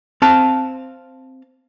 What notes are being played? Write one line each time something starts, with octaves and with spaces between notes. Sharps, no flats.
C4 F5 A5